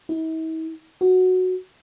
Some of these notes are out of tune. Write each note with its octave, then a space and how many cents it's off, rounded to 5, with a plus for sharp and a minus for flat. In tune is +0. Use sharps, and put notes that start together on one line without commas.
E4 -45
F#4 -5